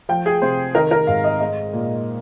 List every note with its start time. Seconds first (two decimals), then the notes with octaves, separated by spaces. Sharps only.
0.09 F3 G5
0.26 G#4
0.42 C3 C5
0.75 D#3 A#4
0.91 A#4
1.07 G#2 F5
1.24 D#5
1.40 G#3 D#5
1.73 A#2